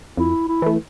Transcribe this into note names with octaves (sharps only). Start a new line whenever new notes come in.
F2 E4
E4
E3 A3